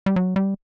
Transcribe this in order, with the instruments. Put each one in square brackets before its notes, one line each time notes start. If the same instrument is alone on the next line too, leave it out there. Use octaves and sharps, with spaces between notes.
[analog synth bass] G3
F#3
G3